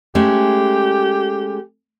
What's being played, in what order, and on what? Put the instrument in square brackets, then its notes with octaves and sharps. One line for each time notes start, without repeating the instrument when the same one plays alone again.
[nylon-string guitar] G#3 A3 C#4 [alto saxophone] G4